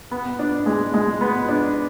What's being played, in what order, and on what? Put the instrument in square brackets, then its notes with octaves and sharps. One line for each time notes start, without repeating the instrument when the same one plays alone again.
[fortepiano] B3
D4
G#3
G#3
B3
D4